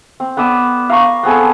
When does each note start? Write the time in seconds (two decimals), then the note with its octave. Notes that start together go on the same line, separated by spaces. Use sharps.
0.20 C4
0.37 B3 B4 D5 E6
0.90 F5 A#5 C#6
1.23 B3 C4 G#4 A4